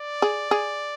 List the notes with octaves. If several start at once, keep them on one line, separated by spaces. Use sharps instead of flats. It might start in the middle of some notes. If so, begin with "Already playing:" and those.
Already playing: D5
G#4
G#4